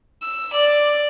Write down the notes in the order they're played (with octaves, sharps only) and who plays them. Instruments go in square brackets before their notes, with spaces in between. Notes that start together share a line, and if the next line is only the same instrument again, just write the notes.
[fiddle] E6
D5